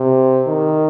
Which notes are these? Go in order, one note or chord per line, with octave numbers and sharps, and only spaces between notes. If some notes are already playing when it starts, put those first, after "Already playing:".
Already playing: C3
D#3